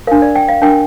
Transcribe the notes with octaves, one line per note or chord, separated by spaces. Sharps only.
D4 A#4 F5
D5
G5
F5
D4 A#4 G5